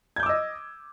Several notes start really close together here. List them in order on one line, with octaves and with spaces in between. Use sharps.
G#6 G6 D6 E6 D#5